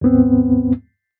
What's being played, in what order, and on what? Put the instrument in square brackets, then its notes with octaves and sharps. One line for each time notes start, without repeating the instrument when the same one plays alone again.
[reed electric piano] D#2 G#2 B3 C4